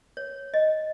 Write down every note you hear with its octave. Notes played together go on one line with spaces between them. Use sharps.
C#5
D#5